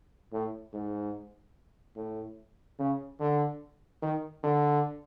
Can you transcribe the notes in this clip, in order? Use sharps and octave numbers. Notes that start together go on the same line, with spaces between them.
A2
G#2
A2
C#3
D3
D#3
D3